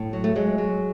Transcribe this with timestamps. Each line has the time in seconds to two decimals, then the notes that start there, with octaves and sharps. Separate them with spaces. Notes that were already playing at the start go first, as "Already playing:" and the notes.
Already playing: A2
0.13 F#3
0.24 A3
0.35 F#3 G#3
0.58 F#3